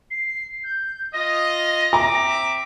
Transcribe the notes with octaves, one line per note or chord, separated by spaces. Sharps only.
C7
G6
F4 D#5 A#6
C4 E5 A#5 D6